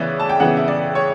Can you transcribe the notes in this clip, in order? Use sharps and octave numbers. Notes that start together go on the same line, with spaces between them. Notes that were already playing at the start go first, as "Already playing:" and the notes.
Already playing: C#3 E3 B3 C#5 D5 E5
A5
G5
C#3 E3 B3 F#5
E5
D5
C#5